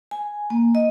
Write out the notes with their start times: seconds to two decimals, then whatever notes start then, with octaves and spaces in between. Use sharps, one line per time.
0.11 G#5
0.50 A#3
0.75 D#5